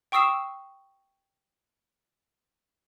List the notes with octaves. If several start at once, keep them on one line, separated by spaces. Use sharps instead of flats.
G5 C#6 D#6 E6 C7 E7